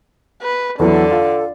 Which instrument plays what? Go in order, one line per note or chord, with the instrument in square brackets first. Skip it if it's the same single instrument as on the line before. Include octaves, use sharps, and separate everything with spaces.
[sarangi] B4
[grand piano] E2 E3 F#3 [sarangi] D3 [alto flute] A4
[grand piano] F4